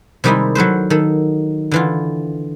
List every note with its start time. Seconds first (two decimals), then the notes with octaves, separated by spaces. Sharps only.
0.24 C3 D#3 G3 G#3 D#4 E4
0.55 F#3 A4 B4 C5
0.90 D#3 A4
1.71 D3 E3 F4